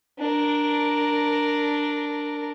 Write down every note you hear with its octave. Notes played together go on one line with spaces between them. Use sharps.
D4 A#4